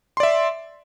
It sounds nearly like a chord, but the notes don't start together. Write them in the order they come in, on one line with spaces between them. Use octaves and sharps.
C6 D5 E5